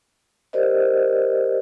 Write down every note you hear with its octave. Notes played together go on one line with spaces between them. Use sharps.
G4 A#4 C5 D5 D#5